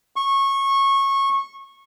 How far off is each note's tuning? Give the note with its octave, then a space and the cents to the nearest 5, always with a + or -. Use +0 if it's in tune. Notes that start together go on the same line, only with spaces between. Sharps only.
C#6 -20